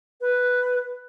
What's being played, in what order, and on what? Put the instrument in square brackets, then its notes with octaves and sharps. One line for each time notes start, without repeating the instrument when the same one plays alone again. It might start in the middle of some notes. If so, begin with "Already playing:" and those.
[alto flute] B4